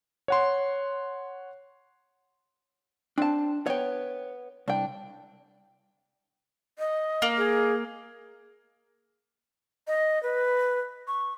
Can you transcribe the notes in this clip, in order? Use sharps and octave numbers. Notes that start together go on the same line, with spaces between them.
C#5 F#5 C6
C4 D4 A5
B3 C#5 G5
C2 D4 G5
D#5
A#3
G#4
D#5
B4
C#6